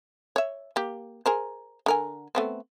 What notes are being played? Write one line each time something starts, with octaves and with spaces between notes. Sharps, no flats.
C#5 E5
A#3 G4
G#4 A#4 C5
D3 A#4 G#5
A3 B3 C4